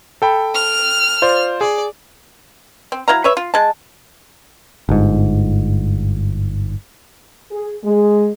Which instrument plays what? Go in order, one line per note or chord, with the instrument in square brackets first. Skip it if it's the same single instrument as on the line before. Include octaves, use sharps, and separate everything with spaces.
[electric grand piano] A4 G5 B5
[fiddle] F6
[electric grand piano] F4 C5 D5
[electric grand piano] G#4 [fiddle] D5
[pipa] C4
F#3 E4 F5 A#5
B4 C#5 E5
F4
G#3 A5
[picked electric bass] G1 G#2
[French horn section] G#4
G#3